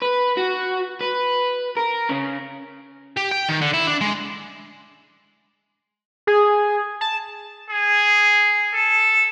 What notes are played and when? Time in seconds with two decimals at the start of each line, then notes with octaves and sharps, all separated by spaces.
0.02 B4
0.37 F#4
1.01 B4
1.77 A#4
2.09 C#3
3.17 G4
3.31 G5
3.49 D#3
3.61 D3
3.74 E4
3.87 D4
4.01 G#3
6.27 G#4
7.01 A5
7.70 G#4
8.73 A4